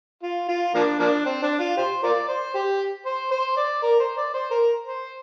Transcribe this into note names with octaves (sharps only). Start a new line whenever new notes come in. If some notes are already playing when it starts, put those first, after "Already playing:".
F4
F4
F3 A#3 D4
F3 A#3 D4
C4
D4
F4
G4 C5
F4 A#4 D5
C5
G4
C5
C5
D5
A#4
C5
D5
C5
A#4
C5